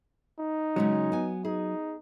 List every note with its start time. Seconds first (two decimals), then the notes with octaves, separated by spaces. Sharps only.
0.39 D#4
0.76 C#3 F#3 G#3 C#4
1.12 B3 G#5
1.45 D#4 G#4